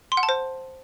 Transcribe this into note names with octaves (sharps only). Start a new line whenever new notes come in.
C6
F#5
A5
C5